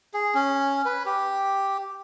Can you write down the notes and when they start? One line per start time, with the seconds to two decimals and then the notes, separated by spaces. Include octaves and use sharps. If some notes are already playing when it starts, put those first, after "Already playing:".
0.14 G#4
0.35 C#4
0.85 B4
1.06 G4